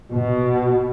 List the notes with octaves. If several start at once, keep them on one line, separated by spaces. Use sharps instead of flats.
B2